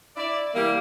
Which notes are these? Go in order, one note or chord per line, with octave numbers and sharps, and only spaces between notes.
E4 D5
E3 G3 A#3